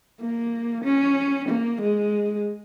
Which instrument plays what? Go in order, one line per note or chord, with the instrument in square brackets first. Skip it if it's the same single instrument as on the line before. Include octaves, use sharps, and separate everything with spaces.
[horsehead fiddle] A#3
C#4
A#3
G#3